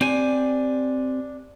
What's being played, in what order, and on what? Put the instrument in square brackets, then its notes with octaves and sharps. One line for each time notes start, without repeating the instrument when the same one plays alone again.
[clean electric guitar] C4 G4 G#5 [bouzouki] D4